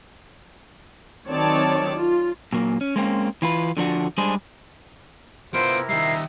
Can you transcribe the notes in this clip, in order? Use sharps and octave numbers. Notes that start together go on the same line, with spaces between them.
D#3 F#3 C4 C#5 D5 A5
F4
A#2 F#3 A#3
C#4
G#3 A#3 C4 C#4
E3 F4 B4
D3 F3 D4 F#4
G3 G#3 D4 G#4 C5
C3 B3 E4 F4 A#4 C5 D7
D#3 G3 D#5 E5 A#5 C7